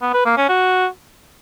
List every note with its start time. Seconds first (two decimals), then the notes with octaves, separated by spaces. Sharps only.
0.02 B3
0.14 B4
0.25 A#3
0.37 C#4
0.49 F#4